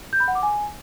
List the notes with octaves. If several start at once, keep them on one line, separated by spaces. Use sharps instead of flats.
G6
B5
F#5
D6
G#5